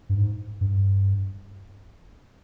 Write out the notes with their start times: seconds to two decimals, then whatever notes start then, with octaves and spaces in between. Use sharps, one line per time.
0.09 G2
0.17 G#2
0.61 G2